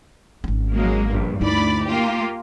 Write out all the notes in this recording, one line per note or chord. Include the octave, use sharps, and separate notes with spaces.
G#1 C#4
F#3 G#3 A#3
A#1 G2
D2 D#4 E4 D5 B5
A#3 F4 G4